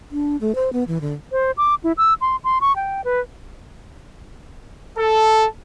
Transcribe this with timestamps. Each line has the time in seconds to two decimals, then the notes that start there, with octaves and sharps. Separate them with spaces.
0.12 D4
0.41 A3
0.55 C5
0.73 B3
0.88 E3
1.01 D3
1.32 C5
1.57 D6
1.84 E4
1.97 E6
2.21 C6
2.44 C6
2.61 C#6
2.76 G5
3.04 B4
4.97 A4